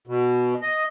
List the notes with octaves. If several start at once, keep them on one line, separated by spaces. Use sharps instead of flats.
B2
D#5